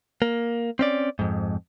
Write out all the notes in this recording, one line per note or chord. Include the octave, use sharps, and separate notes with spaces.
A#3
C4 C#4 D5
F2 G#2